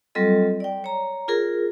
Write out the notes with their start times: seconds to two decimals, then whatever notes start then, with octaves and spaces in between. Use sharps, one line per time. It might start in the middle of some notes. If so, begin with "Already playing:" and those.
0.15 F#3 G3 C4 F4 A4 D#5
0.60 D5 G5
0.84 C#5 A#5
1.28 F4 G#4 A#4